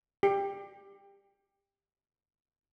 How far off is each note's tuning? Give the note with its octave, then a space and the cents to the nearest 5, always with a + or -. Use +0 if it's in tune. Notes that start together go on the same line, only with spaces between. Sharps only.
G4 +20